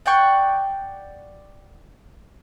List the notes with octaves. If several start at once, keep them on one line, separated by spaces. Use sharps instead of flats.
D5 F#5 G5 C#6